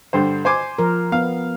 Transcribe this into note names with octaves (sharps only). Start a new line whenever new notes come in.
G2 D3 C5
C5 G#5 D6
F3 A#4
B3 F5